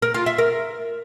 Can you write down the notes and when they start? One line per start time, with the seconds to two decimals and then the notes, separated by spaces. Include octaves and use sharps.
0.02 A#4
0.14 F4
0.26 E5
0.38 A#4